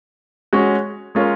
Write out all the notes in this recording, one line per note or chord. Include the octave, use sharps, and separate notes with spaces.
G#3 C#4 F#4
G#3 C#4 F4 A#4 C#5